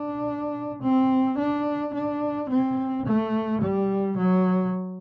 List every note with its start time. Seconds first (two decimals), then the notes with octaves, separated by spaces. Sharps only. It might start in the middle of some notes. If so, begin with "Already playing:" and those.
Already playing: D4
0.82 C4
1.38 D4
1.94 D4
2.50 C4
3.06 A3
3.62 G3
4.17 F#3